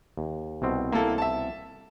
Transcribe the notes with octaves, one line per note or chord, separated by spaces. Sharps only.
D#2
C2 B2 C4
A#3 E4 A4
E5 A5